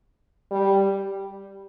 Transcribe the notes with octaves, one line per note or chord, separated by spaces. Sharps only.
G3